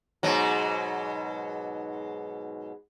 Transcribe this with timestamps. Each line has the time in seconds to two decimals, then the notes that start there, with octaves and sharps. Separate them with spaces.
0.23 G#2 B2 F#3